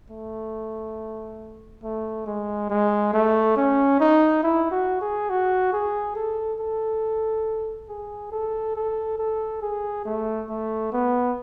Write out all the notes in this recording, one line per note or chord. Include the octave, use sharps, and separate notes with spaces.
A3
A3
G#3
G#3
A3
C#4
D#4
E4
F#4
G#4
F#4
G#4
A4
A4
G#4
A4
A4
A4
G#4
A3
A3
B3